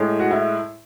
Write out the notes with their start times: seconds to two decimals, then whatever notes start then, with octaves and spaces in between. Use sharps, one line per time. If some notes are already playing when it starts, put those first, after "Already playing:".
Already playing: A2 G#3
0.19 F#4
0.31 E4